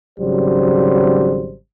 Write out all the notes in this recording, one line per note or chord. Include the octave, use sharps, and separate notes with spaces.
G#1 C#3 F#3 G3 C5